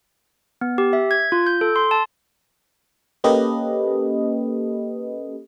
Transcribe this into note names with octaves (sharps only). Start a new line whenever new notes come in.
B3
G4
E5
G#6
F4
G6
A4
C6
A5
A#3 C#4 G4 A4 B4 D#5